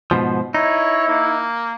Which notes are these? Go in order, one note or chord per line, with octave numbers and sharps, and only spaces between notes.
G#2 B2 F3
D#4 E4 C#5
A#3